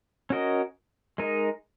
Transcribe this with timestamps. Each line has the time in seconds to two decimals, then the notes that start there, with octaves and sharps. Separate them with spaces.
0.30 C#4 F#4 A#4 D#5
1.18 G#3 D#4 A#4 D#5